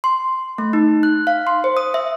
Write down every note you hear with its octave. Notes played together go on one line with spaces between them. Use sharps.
C6
A3
D#4
F#6
F5
C6
C5
D#6
E5